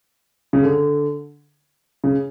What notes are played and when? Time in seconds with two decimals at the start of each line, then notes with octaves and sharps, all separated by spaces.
0.53 C#3
0.63 D3
2.04 C#3